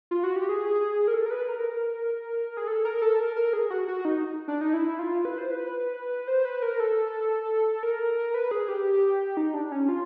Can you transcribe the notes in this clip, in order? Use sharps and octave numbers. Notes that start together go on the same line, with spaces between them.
F4
F#4
G4
G#4
A#4
A4
A#4
B4
A#4
G#4
A4
A#4
A4
A#4
A#4
G#4
F#4
F#4
D#4
D4
D#4
E4
F4
B4
C5
B4
C5
B4
A#4
A4
A#4
B4
G#4
G4
D#4
D4
C#4
F4